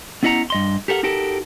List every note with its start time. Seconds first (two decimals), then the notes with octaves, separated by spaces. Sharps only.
0.23 B3 C#4 E4 D#5 F#5 A#5
0.50 G2 D#5 C6
0.88 G4 A4 A#4 F#5
1.03 D#4 F#4 G4 A4 A#4